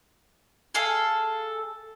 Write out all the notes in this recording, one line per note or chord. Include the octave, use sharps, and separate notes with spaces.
G#4 A4 F5